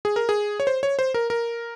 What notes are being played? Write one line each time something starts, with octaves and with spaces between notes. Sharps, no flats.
G#4
A#4
G#4
C#5
C5
C#5
C5
A#4
A#4